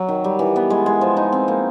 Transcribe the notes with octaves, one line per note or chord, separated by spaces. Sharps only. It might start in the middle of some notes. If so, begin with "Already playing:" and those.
Already playing: F#3
D#3
G3
E3
B3
G#3
G#3
F3
D#4
C4
A#3